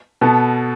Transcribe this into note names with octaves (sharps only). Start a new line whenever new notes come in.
B2 B3 A4